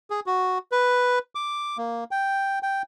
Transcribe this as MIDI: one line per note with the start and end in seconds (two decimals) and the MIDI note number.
0.10 0.20 68
0.26 0.58 66
0.72 1.19 71
1.35 1.77 86
1.78 2.04 58
2.11 2.59 79
2.63 2.82 79